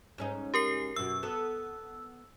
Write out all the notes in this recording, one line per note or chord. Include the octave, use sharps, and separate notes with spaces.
G#2 C#4 D#4
G4 A#4 C7
F#2 B2 E6
B3 A4